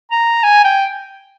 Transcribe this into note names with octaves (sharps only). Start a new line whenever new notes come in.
A#5
G#5
G5